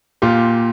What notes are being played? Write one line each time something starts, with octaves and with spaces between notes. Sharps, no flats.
A#2 F4 G4